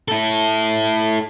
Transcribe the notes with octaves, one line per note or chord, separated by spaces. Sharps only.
E4 A4